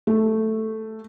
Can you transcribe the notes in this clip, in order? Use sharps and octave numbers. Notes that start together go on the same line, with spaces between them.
A3